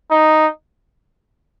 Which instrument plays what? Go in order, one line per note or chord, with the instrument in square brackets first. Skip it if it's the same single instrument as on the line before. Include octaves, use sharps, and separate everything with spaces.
[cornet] D#4